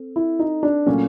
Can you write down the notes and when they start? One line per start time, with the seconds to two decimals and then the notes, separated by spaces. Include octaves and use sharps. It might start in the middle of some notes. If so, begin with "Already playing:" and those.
Already playing: C4 A4
0.16 E4
0.39 D#4
0.63 D4
0.86 A#2 F#3 A3 C#4